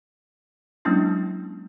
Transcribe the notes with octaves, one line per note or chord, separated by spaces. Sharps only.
F#3 G#3 A#3 C#4 D4 E4